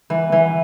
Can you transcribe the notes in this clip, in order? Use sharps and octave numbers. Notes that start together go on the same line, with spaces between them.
E3
E3